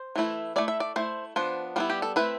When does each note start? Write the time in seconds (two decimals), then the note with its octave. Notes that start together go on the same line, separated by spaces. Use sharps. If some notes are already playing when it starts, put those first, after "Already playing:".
Already playing: C5
0.16 E3 A3 E4
0.56 A3 E4 D5
0.68 E5
0.80 D5
0.96 A3 E4 C5
1.36 F3 B3 D4 C5
1.76 G3 B3 E4 F4
1.90 G4
2.02 A4
2.16 A3 C4 E4 B4